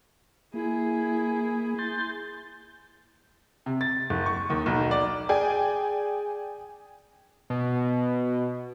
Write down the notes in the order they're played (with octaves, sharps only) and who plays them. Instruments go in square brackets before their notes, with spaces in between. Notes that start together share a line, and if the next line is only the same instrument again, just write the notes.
[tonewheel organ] A#3 [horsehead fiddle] E4 G#4
[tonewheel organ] C6 G6 A6
[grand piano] C3
A6
F#1
C#6
D#2
B1
D5
[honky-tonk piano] G#4 D5 G5 G#5
[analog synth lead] B2